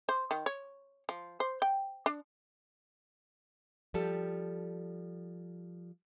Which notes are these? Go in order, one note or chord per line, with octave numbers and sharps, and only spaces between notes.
C5
D#3
C#5
F3
C5
G5
D4
F3 G3 G4 A4